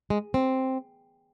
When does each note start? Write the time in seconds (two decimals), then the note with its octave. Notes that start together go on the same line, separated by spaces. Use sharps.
0.10 G#3
0.34 C4